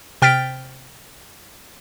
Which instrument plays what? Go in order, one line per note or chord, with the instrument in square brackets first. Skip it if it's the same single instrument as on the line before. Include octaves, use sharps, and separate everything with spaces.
[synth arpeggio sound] C3 G5 F6 A6 B6 D7